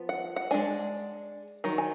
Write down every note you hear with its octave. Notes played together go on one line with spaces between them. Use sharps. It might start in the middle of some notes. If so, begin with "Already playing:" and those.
Already playing: F3 B3
F#5
F#5
G#3 D4 G#5
D#3 F#3
G#5